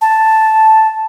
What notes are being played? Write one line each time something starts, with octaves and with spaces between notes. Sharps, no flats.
A5